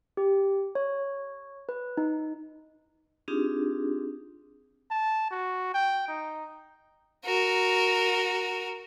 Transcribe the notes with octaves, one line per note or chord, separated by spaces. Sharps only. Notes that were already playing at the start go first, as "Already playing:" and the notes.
G4
C#5
B4
D#4
C4 D4 D#4 F4 G4 G#4
A5
F#4
G5
D#4
F#4 A#4